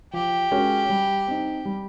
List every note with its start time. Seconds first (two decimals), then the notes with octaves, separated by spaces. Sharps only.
0.13 F3 G4
0.51 G#3 C#4 F#4 A#4
0.89 G3
1.27 C4 D#4
1.65 G3